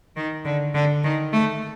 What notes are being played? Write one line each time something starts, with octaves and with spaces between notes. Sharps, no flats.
D#3
D3
D3
D#3
A3